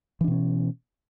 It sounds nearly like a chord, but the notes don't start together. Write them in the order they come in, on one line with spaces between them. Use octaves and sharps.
E3 D4 B2 C#4